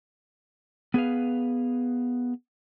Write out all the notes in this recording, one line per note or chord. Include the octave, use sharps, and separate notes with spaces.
B3 G#4 B4 F5